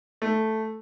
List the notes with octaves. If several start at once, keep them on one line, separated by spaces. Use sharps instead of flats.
A3